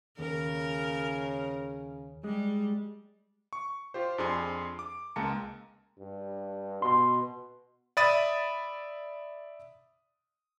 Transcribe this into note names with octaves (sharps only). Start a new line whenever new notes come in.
D#2 C#3 A#4
G3 G#3
C#6
F4 G4 C5
F2 D4 G#4 C6
D6
C#2 G#3 A#3 A5 A#5 C#7
G2
B2 C6
D5 E5 B5 D#6 A6 D#7